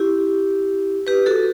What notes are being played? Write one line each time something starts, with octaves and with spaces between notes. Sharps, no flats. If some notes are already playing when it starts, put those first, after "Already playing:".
Already playing: E4 G4
G4 B4
F#4 A4